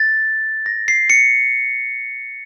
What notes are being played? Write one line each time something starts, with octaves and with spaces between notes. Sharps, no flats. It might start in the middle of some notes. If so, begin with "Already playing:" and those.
Already playing: A6
A#6
C7
C#7